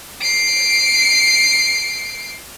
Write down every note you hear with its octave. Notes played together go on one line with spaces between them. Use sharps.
C7 D7